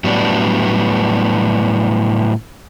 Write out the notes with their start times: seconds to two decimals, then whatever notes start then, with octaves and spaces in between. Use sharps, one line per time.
0.04 A2 F#3 G3 B3 D4